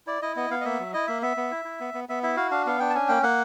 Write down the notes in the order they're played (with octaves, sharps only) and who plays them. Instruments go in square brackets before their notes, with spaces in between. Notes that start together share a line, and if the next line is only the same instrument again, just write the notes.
[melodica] E4 D5
E4 D#5
B3 D#5
B3 F5
D#5
A#3 E5
F#3
E4 D#5
A#3 E5
B3 E5
B3
E4
E4
B3
B3
B3 E5
E4 E5
F#4 F5
D4 F5
B3 F5
D4 G5
A5
C#4 G#5
A#3 G5
A#3 F#5